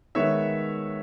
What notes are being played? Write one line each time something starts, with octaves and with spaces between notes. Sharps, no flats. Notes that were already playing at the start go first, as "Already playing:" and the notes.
D#3 G#3 B3 C#5 E5